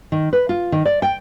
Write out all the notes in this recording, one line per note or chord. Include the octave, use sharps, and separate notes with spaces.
D#3
B4
F4
D#3
D5
G5